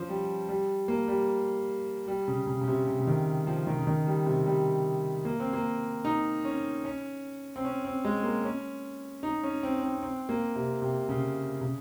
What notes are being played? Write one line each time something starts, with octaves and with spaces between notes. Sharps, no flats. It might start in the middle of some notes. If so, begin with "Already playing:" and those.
Already playing: F3 C#4
G3
G3
A#3
G3
G3
C#3
C#3
C#3
C3
C#3
C#3
D#3
F3
D#3
C#3
D#3
G3
C3
G3
A#3
C4
A#3
D#4
C#4
C#4
C4
C#4
C4
G#3
A#3
C#4
D#4
C#4
C4
C4
C4
A#3
C3
C3
C#3
C#3